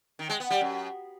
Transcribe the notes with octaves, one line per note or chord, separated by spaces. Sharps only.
D#3
G#3
B3
G3
F#2